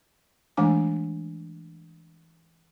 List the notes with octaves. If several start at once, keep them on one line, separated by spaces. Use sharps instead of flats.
E3 G#3 A3 D4 G#5 D6